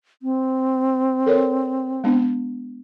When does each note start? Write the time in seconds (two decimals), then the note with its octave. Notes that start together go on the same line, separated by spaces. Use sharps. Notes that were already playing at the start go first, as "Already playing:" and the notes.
0.22 C4
1.26 A4 A#4 C#5
2.04 G#3 B3 D4